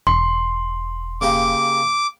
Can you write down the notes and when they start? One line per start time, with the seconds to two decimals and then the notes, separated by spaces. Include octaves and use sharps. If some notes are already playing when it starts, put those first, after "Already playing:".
0.07 E1 C6
1.21 C#3 A#3 G4 D6